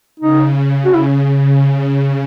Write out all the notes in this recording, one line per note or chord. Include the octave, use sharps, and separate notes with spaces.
C#3 D#4
F#4
E4